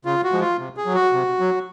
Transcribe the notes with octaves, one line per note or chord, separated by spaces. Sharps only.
C#3 F4
F#4
F3 G#3
F4
C3
G#4
F#3
F#4
C3
F#3